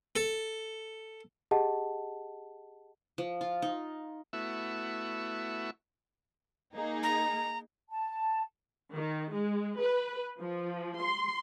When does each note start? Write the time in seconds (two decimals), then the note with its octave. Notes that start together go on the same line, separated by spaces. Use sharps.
0.16 A4
1.51 G4 G#4 D#5 F#5 A5
3.18 F3
3.41 F4
3.62 D#4
4.33 A3 B3 E4 F#4 E5 C#6
6.74 A#3 D#4 G#4
7.03 A#5
7.91 A5
8.94 D#3
9.31 G#3
9.80 B4
10.40 F3
10.99 C6